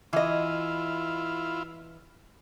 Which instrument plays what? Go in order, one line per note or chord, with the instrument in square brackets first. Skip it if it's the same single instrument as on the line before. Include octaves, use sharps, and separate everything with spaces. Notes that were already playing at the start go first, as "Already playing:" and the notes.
[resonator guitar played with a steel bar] E3 D#5 [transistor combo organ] E4 F4